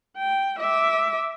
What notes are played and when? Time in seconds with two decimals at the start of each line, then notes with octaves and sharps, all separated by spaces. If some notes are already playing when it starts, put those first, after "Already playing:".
0.18 G5
0.60 E5 D6